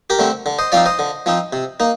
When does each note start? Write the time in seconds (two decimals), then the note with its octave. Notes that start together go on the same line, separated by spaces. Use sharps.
0.10 G4 A#4
0.19 D3 A3 C4
0.46 D3
0.59 C5 D#5
0.72 F3 C4 D#4 D5 F5
0.86 C5 D#5
0.99 D3
1.26 F3 C4 D#4
1.53 C3
1.80 A#3 D#4